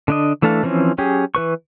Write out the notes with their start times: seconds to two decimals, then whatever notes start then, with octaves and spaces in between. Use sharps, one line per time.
0.08 D3 D4 D#5
0.42 E3 A3 D4 A4 F5
0.63 E3 F3 C4 C#4
0.98 F#3 C#4 G4 G#4
1.35 E3 B4 C#6